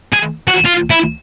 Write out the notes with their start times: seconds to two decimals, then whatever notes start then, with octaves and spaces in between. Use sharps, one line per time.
0.13 G#4
0.47 F#4
0.65 F4
0.90 E4